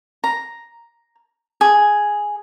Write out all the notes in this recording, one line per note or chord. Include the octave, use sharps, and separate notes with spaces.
A#5
G#4